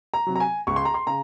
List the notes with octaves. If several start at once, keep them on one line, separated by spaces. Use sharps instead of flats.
A#5
C3 F#3
A#5
G#5
C#2 C#6
C6
A#5
C6
C#3 A#5